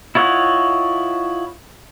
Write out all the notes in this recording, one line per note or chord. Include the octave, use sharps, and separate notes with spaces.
E4 F4 C#5 D#5 F#5